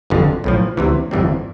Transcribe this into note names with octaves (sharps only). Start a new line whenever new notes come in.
G1 F2 D3
B1 A2 F3
D2 C3 E3
G1 F2 E3 G3 C4